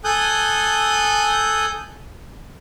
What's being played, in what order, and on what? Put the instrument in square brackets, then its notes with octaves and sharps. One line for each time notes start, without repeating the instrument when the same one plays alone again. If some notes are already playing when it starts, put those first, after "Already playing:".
[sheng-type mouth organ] A4 G#5 D#6 F#6 G6